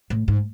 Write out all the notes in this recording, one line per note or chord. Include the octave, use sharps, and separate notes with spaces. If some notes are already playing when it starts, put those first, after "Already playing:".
A2
G#2